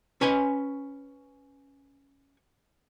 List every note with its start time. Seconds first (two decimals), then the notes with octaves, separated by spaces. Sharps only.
0.21 C#4 B4 G#5